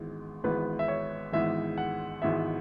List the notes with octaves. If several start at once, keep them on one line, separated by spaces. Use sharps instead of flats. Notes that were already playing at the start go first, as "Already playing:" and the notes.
Already playing: G#1 G#2 E3 G#3 B3
G#1 G#2 E3 G#3 B3 B4
E5
C#5
G#1 G#2 E3 G#3 B3 E5
F#5
G#1 G#2 E3 G#3 B3 E5